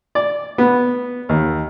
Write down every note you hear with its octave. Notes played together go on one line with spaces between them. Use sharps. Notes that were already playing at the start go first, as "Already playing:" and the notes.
D5
B3
D#2